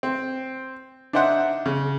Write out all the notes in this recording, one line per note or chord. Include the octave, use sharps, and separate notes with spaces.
C4
D4 D#4 C5 E5 F#5
C#3